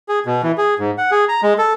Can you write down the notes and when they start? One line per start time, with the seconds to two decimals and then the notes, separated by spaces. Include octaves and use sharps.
0.09 G#4
0.26 B2
0.43 E3
0.58 G#4
0.79 G#2
0.98 F#5
1.11 G#4
1.29 A#5
1.43 G#3
1.58 A4